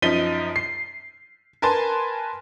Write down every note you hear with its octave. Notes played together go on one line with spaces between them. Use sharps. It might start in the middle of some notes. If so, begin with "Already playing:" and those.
F#2 F3 D#4 B6 D#7 G7
C7
A#4 B4 G#5 A5 C6